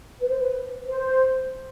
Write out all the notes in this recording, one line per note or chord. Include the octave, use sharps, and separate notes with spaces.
B4
C5
B4
C5